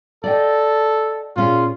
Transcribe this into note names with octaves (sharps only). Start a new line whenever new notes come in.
A4 D5 D#5 G5
A#2 C#4 F4 G#4